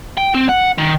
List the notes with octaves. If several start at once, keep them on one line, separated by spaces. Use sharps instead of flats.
G5
C4
F#5
D#3